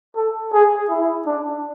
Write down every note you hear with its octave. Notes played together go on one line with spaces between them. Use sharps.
A4
G#4
E4
D4